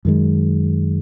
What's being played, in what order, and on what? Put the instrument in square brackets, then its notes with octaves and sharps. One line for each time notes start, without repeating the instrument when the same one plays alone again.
[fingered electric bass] F#2 D#3 G#3